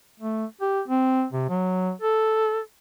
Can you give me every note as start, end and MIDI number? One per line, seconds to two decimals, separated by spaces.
0.20 0.45 57
0.61 0.81 67
0.88 1.24 60
1.33 1.45 48
1.49 1.92 54
2.02 2.59 69